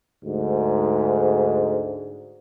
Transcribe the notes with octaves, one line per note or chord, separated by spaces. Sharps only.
D2 G#2